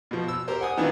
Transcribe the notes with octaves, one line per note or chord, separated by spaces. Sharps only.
B2 F3
E6
G4 A#4 C5
F#5 G#5 D#6
D#3 E3 B3 C4 D4 F4